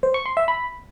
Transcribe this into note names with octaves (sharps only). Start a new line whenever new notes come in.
C5
C#6
C6
E5
B5